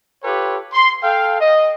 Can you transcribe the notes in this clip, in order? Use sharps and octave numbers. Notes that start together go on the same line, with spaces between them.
F4 G4 A4 B4 C#5 G5
C6
A4 F5 G5
D#5